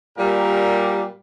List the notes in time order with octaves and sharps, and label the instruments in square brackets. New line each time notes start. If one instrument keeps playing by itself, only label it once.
[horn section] A#2 G3 G4 A#4